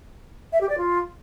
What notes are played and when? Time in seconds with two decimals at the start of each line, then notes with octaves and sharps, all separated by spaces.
0.52 E5
0.61 G4
0.69 D5
0.78 F4